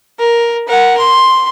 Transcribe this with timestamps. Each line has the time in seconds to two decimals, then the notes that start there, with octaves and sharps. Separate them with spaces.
0.19 A#4
0.68 A#4 F#5
0.98 C6